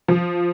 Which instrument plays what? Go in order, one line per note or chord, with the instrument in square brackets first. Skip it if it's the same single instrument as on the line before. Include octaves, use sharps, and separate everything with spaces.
[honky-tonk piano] F3